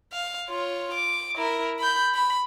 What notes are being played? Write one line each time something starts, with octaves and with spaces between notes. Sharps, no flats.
F5
F4 C#5
D6
E4 A#4
B5 G6
B5